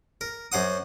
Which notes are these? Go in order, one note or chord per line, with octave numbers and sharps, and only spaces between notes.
A#4
F#2 C5 F#5 D#6